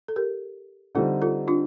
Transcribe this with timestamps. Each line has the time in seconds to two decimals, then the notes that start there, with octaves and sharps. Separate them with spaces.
0.08 A4
0.16 G4 A#4
0.95 D3 G3 C4 D#4 F4 A4
1.22 F4 A4
1.48 D4 F4